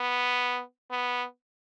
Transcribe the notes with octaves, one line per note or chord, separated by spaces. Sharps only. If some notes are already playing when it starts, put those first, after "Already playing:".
Already playing: B3
B3